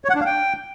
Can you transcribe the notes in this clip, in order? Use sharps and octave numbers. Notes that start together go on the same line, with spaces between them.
C#5
F#5
D4
F5
G5